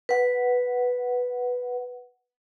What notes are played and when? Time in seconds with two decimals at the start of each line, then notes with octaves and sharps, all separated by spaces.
0.09 B4 F#5